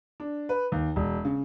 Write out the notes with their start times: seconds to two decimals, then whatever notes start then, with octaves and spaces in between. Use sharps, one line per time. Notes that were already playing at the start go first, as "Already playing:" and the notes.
0.20 D4
0.49 B4
0.72 D#2
0.96 E1
1.25 C#3